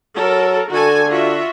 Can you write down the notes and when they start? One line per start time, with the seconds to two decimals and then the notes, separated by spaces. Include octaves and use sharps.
0.17 F#3 A4 A#4
0.71 D3 F#4 A4 G#5
1.10 F4 F#4 E5